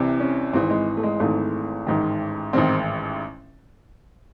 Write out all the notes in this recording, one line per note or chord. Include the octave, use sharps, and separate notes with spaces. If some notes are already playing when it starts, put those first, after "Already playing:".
Already playing: C2 C3 E3
C#4
G#1 G#2 E3 C4
G#3
A3
G#3
G#1 G#2 E3 A3
A1 G#2 D#3
A1 G#2 D#3 C4